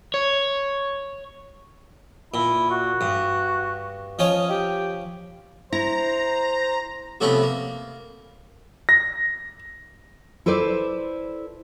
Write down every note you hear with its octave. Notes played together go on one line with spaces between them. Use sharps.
C#5
A#2 E4
F#4
G2
F3 C#4 C#5 D#5
G4
E4 C5 A#5
C3 F3 A3 B3 C#4 B4
A#3
A#6
E4 A4 B4 C5 D5